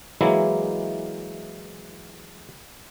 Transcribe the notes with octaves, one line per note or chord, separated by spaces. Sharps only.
E3 F#3 G#3 A#3 E4